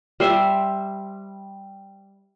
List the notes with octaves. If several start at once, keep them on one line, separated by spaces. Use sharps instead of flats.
G3 C5 E5